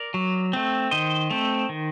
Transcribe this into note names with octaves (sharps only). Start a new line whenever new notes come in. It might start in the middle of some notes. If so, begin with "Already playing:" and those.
Already playing: A#4 D5
F#3
A3 C4
D#3 C5 D#5
A3 C4
D#3